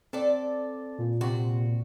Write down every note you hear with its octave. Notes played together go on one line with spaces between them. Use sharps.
C4 A4 D5
A#2
C3 C4 F#4